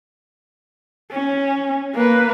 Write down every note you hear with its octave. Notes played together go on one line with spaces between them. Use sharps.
C#4
A#3 B4